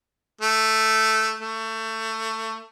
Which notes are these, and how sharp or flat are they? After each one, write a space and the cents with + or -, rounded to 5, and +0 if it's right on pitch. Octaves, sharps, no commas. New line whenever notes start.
A3 +0
A3 +20